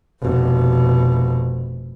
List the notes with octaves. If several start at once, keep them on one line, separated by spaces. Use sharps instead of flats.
F1 B2